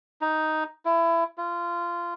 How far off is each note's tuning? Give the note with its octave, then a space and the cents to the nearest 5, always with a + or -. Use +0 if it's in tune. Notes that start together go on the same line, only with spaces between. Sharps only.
D#4 +5
E4 +25
F4 -20